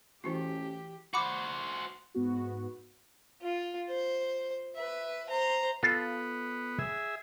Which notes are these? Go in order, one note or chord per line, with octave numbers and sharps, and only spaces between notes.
A1 E3 E4 F#4 G4
F#4 C5 F#5 B5 D6
G#2 B3 F#4
F4
C5
B4 E5
C5 A#5
B3 F4 A4
G#4 E5